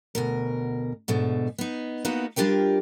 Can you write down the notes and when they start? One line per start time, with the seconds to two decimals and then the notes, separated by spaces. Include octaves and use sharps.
0.15 D2 B2 A#4
1.08 G#2 B2 D3 A3
1.58 B3 D#4
2.05 A#3 B3 D#4 E4 F#4
2.36 G3 D4 F4 G4 A#4 G5